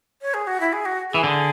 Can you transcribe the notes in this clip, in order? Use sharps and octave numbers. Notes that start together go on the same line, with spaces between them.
C#5
G#4
F#4
E4
G#4
F#4
E3 G#4
D3